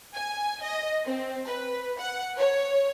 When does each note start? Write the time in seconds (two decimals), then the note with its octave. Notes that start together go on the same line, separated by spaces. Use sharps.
0.14 G#5
0.63 D#5
1.05 C4
1.46 B4
2.00 F#5
2.37 C#5